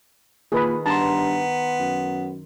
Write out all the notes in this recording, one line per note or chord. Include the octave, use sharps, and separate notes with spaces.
A#2 D#3 G#4 B4 B5
G2 B3 A5 A#5 C6
F#2